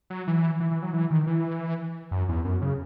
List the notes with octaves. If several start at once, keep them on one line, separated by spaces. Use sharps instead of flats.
F#3
E3
E3
E3
F#3
E3
D#3
E3
F#2
E2
F#2
C#3